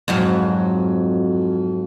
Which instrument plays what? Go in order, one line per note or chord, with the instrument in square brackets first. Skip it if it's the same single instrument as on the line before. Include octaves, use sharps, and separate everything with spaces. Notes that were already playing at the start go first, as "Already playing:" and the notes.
[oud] F2 G#2 F#3